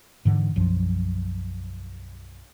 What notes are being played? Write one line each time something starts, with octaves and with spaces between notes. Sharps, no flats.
G#2 D3 E3
B1 F#2 F3